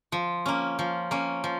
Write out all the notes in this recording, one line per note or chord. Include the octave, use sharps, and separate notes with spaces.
F3
A#3 C#4
F3
A#3 C#4
F3